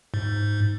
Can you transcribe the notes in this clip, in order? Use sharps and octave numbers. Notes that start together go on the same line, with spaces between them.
G#2